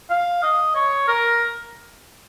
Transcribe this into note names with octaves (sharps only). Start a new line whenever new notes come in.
F5
D#5
C#5
A#4